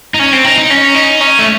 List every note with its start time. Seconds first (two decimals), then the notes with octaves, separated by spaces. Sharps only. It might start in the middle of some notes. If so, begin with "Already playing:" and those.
0.14 D#4
0.19 C#4
0.32 C4
0.44 D#4
0.58 D#4
0.70 C#4
0.95 D#4
1.21 C#4
1.39 A3